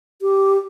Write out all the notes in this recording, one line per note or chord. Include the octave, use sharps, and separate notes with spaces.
G4